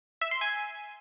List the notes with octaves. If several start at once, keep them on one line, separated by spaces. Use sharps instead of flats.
E5
C6
G#5